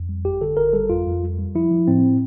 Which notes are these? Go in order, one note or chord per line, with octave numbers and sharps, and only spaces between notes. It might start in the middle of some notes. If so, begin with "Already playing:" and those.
Already playing: F2
G3
G1 G4
D3 A4
G1 A#4
G3 A4
F2 F4
F2
G3
G3
F3 E4
F3
A2 C4